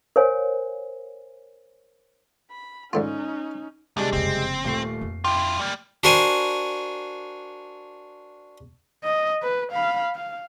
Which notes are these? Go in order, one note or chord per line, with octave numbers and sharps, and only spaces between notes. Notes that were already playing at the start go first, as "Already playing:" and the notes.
A#4 C5 C#5 F5 G#5
B5
G#2 D3 C#4 D#4 F4
D2 C3 G3 G#3 D4
F#1 F2 C4
D#1 A3 C7
F2
E4 F4 G5 C6 D6
G3 A#3
D4 F#4 A#4 C5 G#5
D#5
B4
F5 B5
F5